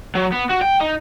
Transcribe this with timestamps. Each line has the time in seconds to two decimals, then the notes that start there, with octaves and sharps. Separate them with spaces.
0.15 F#3
0.33 B3
0.50 F#4
0.62 G5
0.81 D#4